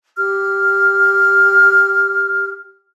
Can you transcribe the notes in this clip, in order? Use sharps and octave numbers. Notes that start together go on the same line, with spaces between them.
G4 F6